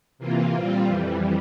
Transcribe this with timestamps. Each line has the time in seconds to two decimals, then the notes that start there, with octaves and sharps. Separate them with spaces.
0.18 C3 E3 A#3 F4
0.53 A#2 G3 C4 F4
0.87 F2 E3 G3